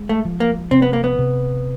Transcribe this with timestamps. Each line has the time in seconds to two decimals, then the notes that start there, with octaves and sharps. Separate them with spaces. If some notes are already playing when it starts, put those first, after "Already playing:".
Already playing: G#3
0.09 A3
0.25 F3
0.40 A#3
0.71 C3 C4
0.82 B3
0.93 A#3
1.04 B3
1.19 C3